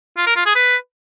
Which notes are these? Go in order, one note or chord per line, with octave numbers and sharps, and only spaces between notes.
F4
A#4
F4
G#4
B4